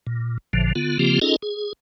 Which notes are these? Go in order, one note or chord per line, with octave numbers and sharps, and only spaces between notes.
A#2
A1 A#2 D3 F3
D3 B3 F4
C#3 F3 A#3 C4 F4 G4
C#4 D#4 F4 G#4 A4 D#5
G#4